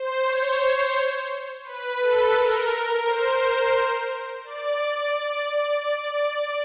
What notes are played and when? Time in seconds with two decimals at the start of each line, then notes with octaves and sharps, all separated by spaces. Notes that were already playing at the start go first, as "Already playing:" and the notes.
Already playing: C5
0.25 C#5
1.64 B4
2.00 A4
2.34 A#4
3.04 C5
3.39 C5
4.44 D5